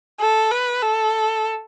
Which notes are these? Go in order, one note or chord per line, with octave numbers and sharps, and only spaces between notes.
A4
B4
A4